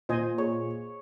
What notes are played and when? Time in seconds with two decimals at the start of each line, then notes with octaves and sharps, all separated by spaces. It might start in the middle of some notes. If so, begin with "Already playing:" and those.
0.09 A#2 C5 D#5 G#5
0.38 G#4 C#5